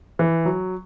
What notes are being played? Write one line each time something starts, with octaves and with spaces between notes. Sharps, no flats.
E3
F#3